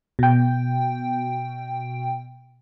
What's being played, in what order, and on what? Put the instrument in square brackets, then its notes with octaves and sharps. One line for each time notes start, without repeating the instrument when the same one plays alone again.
[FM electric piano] B2 G5